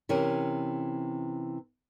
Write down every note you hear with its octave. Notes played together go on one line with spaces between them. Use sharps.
C3 E3 C#4 A#4